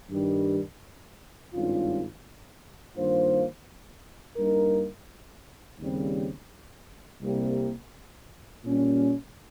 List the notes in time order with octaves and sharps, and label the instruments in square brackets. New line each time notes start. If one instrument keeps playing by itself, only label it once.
[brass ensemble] G2 D#3 G3
G#1 G2 G3 C#4 F4
G2 D#3 A#3 F4 C5
G2 G3 A#3 D#4 A#4
D#2 C#3 G3 C4
C2 C3 G3 A#3
A#2 G3 C#4